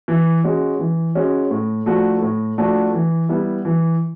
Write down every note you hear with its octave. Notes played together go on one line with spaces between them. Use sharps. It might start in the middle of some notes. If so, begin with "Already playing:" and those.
E3
G#3 C#4 F#4
E3
G#3 C#4 F#4
A2
F3 A3 D4 F#4
A2
F3 A3 D4 F#4
E3
G3 B3 E4
E3